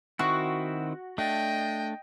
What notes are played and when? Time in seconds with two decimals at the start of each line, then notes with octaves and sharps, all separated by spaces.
0.19 D#3 C4 E4 F#4
1.18 A3 D4 D#5 G5